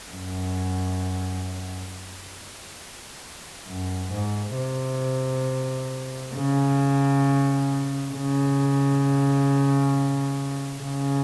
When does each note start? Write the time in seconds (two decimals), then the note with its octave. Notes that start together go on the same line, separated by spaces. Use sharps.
0.12 F#2
3.68 F#2
4.12 G#2
4.57 C3
6.35 C#3
8.14 C#3
10.82 C#3